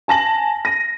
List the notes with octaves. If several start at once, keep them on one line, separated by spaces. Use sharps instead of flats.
G#5 A5 A#6 F#7
A#6 D#7